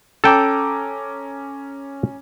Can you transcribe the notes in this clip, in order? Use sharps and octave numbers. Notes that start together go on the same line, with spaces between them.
C#4 A4 G5 A#5 D6